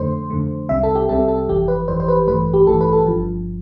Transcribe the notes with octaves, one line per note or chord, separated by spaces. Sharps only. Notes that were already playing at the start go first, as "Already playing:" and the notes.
Already playing: F2 D3 A3 C5
F2 D3 A3
C2 C3 G3 C4 E5
A4
G4
C2 C3 G3 C4 A4
A4
G1 F2 E3 G4
B4
G1 F2 E3 C5
C5
B4
A1 G2 E3 A3 B4
G4
A1 G2 E3 A3 A4
B4
A4
G1 G2 F3